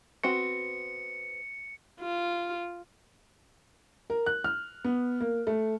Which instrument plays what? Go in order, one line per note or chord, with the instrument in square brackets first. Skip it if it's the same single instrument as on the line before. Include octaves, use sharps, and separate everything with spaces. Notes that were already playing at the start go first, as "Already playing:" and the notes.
[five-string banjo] B3 C4 F#4 [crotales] C#7
[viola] F4
[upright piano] A#4
F#6
F6
B3
A#3
A3